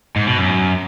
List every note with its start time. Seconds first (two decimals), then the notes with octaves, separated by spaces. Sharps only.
0.16 G#2
0.27 B2
0.38 F#2